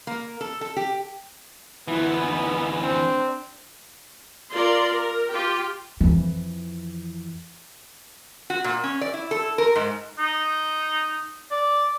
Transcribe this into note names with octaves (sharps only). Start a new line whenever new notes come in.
A#3
A4
A4
G4
D2 E3 B3 E4
D#4
C4 D4
F4 A#4 D5 C6
A#4
F4 G4 G5
F2 E3
F#4
A#2
C#4
D5
E4
A4
A#4
G#2
D#4
D5